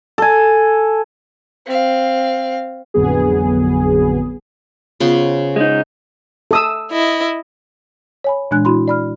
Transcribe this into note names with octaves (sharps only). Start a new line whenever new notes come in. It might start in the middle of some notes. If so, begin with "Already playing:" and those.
A4 G#5
C4 F5
A1 F2 D3 F#3 B3 G#4
C#3 B3 F4 C5
G#3 D#4
A4 D#6 E6
E4 D#5
C#5 G#5 B5
A#2 E3 G#3 D4 G#5 F#6
E4 F#4 B5 C6
D5 B5 F6